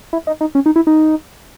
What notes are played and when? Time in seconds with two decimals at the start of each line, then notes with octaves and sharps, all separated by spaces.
0.13 E4
0.27 D#4
0.41 D#4
0.55 C#4
0.66 D#4
0.76 E4
0.87 D#4